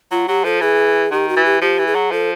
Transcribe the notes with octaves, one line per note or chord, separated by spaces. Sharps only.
F#3 F4
F#3 G4
F3 A4
E3 G#4
D#3 G4
F#4
E3
G4
F3 G4
E3
G#4
F#3
F3 A4